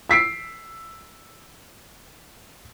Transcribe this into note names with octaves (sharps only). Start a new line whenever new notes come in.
E6 B6 C7 D7